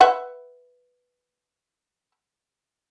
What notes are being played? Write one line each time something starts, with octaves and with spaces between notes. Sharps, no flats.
B4 E5 F#5